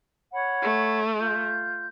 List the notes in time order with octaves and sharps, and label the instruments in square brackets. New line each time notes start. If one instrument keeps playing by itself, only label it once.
[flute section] C#5 F#5 B5
[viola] A3
[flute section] F4 G6